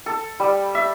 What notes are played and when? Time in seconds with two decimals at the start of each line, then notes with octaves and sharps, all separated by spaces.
0.06 A4
0.40 G3
0.75 E5